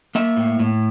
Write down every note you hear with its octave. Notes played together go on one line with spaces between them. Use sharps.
A#3 E5
A2
A2